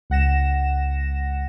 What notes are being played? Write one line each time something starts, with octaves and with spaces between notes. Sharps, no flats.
C#2 F#5 A#6 E7